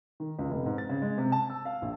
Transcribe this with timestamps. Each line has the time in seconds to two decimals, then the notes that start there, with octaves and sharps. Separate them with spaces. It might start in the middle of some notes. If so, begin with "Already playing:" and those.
0.20 D#3
0.39 C#2
0.50 F1
0.66 G#2
0.78 A6
0.89 C#3
1.02 G#3
1.18 C3
1.32 A5
1.50 E6
1.65 F5
1.82 A#1